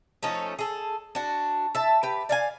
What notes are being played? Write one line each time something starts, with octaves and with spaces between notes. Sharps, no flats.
F3 A3 C#4 D#4
G#4 A4
D4 F#4
E5 A5
G4 B4
D5 F5 G#5